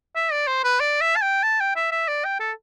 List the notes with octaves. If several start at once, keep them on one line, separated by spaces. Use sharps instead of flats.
E5
D5
C5
B4
D5
E5
A5
G5
A5
G5
E5
E5
D5
G5
A4